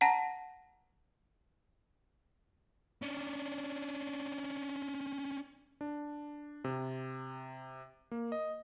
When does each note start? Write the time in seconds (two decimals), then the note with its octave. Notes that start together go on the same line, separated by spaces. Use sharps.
0.01 F#5 A5 A#5 A#6
3.02 C#4 D4
5.81 D4
6.64 C3
8.11 A#3
8.32 D#5